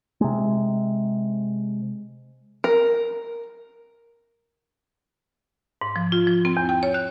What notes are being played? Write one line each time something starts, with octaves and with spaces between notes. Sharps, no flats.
C3 G#3
A#4
G#2
F3
F4
F3
C4
E2
G5
C#5
F#6